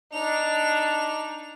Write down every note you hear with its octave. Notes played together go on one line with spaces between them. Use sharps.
D4 D#4 F7